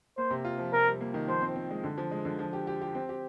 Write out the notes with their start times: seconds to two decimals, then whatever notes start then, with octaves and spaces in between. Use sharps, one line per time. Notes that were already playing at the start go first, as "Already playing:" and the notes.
0.17 A#3 C5
0.30 C3
0.44 F4
0.58 F3
0.73 C3 A#4
0.87 G3
1.01 A#3
1.14 D#3
1.28 F3 C5
1.42 C4
1.56 C4
1.70 G#3
1.84 D3
1.98 F3
2.11 G#3
2.25 D3
2.39 F3
2.53 G4
2.67 G4
2.82 G4
2.95 C4
3.09 G4